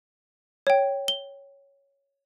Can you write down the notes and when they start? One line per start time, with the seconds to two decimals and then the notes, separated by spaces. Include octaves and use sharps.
0.67 C#5 G5
1.08 G7